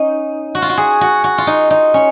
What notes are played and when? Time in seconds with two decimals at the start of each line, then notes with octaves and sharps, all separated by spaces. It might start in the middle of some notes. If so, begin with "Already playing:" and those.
Already playing: C#4 D#4
0.55 F#4
0.62 F4
0.69 F#4
0.77 G#4
1.01 F#4
1.24 F#4
1.38 F4
1.47 D#4
1.70 D#4
1.94 C#4